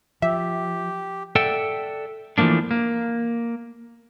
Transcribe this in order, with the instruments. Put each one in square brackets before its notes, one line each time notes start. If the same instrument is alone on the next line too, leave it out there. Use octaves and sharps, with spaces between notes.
[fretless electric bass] F3 [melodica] G4 [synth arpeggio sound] E5
[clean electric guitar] A4 D5 E5 F#5 G5
E3 F3 A3 A#3 D4
A#3